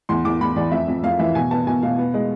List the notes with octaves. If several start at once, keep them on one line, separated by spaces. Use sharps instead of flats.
E2 C6
E2 D6
E2 B5
E2 D5
F2 E5
F2
F2 F5
E3 E5
B2 G#5
B3 A5
B2 G#5
B2 F5
B3
G#3